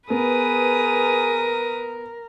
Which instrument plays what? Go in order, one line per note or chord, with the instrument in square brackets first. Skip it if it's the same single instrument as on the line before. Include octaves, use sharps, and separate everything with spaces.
[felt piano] B3 [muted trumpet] G#4 [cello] A#4 [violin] B4 D#6